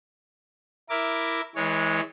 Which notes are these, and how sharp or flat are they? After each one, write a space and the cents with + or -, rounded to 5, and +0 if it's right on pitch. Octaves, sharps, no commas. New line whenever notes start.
E4 +0 A#4 +0 D6 +0
E3 -30 G#3 +0 C#5 +0